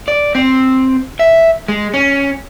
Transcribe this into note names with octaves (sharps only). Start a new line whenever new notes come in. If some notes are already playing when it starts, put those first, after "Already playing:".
D5
C4
E5
G#3
C#4